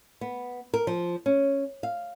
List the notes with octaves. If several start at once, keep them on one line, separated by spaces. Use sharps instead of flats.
B3
A#4
F3
C#4
F5